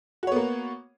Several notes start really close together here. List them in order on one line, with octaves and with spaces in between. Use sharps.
F#4 C#5 B3 A#3